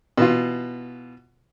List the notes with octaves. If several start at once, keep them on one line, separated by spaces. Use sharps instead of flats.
B2 E3 F4